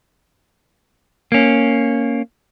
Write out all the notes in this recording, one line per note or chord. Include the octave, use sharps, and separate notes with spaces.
A#3 C#4